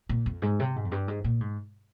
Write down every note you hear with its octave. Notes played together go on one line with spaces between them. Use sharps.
A#2
F2
G#2
C3
G#2
F2
G2
G#2
A#2
G#2